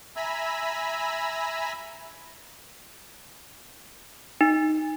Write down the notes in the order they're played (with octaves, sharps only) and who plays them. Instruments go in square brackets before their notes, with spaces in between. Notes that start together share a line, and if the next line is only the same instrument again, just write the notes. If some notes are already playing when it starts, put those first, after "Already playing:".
[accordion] E5 G#5 A#5 B5 E6
[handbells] D#4